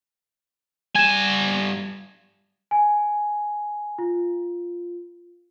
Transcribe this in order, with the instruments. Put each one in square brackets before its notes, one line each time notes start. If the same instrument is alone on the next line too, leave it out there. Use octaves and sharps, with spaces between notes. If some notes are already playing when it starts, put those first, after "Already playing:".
[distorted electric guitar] G2 G#5 [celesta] G#6 E7
[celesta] G#5
F4